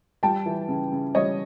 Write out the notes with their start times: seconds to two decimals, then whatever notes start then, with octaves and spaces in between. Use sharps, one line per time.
0.23 G3 G5 A5
0.46 E3
0.68 C#3
0.92 C#3
1.15 G3 C#5 D#5